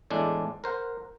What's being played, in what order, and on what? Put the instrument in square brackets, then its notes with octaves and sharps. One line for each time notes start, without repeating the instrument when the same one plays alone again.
[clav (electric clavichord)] E2 A2 G#3 D4
A#4 C5 F#5